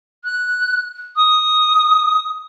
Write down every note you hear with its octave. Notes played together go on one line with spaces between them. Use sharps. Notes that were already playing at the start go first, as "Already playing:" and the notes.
F#6
D#6